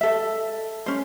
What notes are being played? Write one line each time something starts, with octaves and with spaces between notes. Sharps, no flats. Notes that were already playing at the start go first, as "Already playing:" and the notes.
A4 E5
C#4 C5